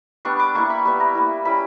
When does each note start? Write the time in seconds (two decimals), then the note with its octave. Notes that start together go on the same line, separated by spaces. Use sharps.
0.25 G3 B3 D4 C#6
0.39 D6
0.55 A#3 E4 C#6
0.70 B5
0.85 G3 B3 E4
1.00 A#5
1.15 A#3 E4
1.45 G3 C#4 E4 B5